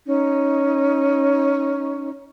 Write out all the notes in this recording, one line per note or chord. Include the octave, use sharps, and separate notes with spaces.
C#4 D#4